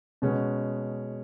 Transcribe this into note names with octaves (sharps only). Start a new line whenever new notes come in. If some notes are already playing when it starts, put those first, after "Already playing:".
B2 G#3 C#4